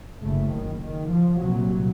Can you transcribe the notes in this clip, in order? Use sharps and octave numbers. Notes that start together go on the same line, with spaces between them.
F#1 F#2 C#3 A3
D#3
D#3
F3
C2 A#2 F#3